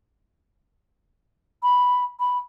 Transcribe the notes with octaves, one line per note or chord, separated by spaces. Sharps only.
B5
B5